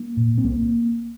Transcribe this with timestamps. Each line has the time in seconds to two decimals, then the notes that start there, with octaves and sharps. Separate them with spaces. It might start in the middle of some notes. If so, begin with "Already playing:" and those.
Already playing: A#3
0.17 A#2
0.38 C4
0.43 C2 A#3